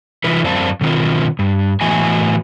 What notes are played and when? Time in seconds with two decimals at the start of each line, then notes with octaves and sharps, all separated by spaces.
0.24 C3 E3 D#4 F4 B4
0.44 F#2 C4 D5 F5 A5
0.81 B2 D#3 C4 F4
1.39 G2
1.81 A2 E3 B3 F#4 D#5 G#5